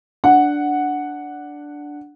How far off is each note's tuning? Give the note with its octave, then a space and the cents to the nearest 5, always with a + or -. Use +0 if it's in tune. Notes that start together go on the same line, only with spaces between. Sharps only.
D4 -5 F#5 +0